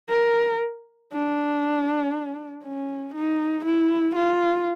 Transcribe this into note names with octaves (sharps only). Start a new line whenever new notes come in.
A#4
D4
C#4
D#4
E4
F4